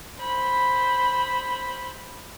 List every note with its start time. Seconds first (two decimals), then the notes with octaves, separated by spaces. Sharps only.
0.21 C5 B5